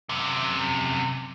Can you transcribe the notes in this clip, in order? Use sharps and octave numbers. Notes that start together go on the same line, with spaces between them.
F#2 C3